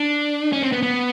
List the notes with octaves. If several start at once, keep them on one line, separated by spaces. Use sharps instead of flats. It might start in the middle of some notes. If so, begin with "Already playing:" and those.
Already playing: D4
C#4
C4
B3
B3